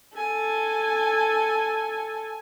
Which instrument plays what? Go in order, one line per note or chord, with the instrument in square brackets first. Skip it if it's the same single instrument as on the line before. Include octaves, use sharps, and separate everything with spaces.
[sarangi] A4 [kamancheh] G#5